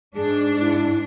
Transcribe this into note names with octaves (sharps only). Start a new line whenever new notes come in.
G#2 D4 G#4
E4